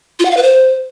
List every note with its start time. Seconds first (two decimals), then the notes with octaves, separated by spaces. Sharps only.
0.19 F4
0.25 F#5
0.31 F5
0.37 B4
0.43 C5